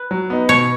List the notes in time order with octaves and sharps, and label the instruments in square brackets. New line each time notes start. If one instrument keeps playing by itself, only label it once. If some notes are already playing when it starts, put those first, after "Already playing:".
Already playing: [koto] B4
[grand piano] F#3
B3 D#4
[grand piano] B2 [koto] C#5